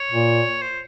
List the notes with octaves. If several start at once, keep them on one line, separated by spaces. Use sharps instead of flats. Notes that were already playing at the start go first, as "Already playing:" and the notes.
Already playing: C#5
A#2
C5